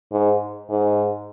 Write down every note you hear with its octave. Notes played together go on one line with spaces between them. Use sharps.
G#2
G#2